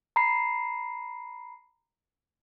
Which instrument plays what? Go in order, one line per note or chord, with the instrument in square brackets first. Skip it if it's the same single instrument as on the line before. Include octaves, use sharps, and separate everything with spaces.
[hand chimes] A#5 B5 C7